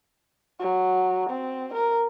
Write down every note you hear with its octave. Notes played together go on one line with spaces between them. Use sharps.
F#3
C4
A#4